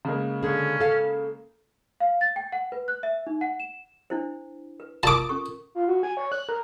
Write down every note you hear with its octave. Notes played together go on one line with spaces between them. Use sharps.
C#3 G#3 A#3
D3 C#4 G#4
A4 F5
F5
A6
G5
F#5
B4
F#6
E5
D#4
F#5
E7
D4 E4 C5
B4
F4 A#4 A5 D6 D#6
C#4 A4 C#6
F4
F#4
G#5
C#5
F#6
A#4